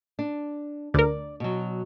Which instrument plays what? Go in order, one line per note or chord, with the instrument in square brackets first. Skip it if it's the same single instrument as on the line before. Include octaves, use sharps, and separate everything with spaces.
[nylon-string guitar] D4
[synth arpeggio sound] D2 A#4 [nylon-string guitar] D5
[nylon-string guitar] B2 F#3